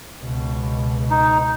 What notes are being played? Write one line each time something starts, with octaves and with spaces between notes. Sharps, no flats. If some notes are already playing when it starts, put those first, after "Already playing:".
C#2 B2
D#4